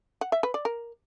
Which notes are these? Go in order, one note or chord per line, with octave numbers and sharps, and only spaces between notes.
F#5
E5
B4
D5
A#4